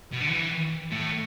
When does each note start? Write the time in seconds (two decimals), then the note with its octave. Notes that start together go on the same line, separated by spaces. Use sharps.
0.13 B2
0.21 D3
0.29 E3
0.91 A2